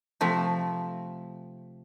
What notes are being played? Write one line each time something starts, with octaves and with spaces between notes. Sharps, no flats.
C3 F3 A3